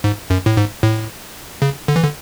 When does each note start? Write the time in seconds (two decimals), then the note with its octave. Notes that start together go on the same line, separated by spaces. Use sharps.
0.04 G#2
0.30 F#2
0.46 A2
0.57 G#2
0.83 A2
1.62 C#3
1.88 D3
1.96 E3
2.03 D3